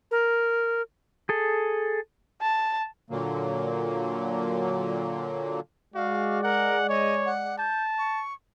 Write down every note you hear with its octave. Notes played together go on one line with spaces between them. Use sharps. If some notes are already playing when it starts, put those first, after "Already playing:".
A#4
G#4 A4
A5
A#2 D3 F#3 A#3
G#3 F#4 D5 F5
A#4 F#5
C#5 D#5
F#5
A5 G6
C#6